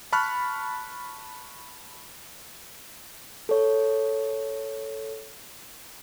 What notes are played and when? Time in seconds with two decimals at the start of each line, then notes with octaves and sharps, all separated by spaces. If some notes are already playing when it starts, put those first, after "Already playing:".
0.12 A5 B5 C#6 F6 F#6
3.49 A4 C#5